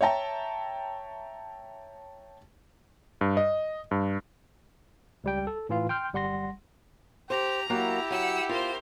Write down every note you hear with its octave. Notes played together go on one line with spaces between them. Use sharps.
C#5 E5 G5 A5 A#5
G2
D#5
G2
C#2 G3 G5
A4
A2 E3 F4 F5
G5 C6 F6 G6
G1 G3 F#5 C6 A#6
G4 C5 A#5
F#3 A#3 E4 G4 F#5
F#3 F#5 E6
F4 A#4 C5